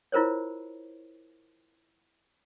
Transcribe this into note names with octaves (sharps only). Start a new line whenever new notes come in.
E4 F4 A#4 C5 C#5